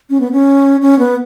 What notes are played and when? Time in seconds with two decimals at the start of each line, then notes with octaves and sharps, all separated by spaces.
0.10 C#4
0.20 B3
0.32 C#4
0.81 C#4
0.99 B3